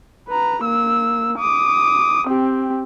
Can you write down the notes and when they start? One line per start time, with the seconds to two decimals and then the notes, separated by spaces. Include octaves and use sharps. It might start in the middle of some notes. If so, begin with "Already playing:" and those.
0.28 B4 A#5
0.64 A#3 E6
1.39 D6 D#6
2.28 C4 G4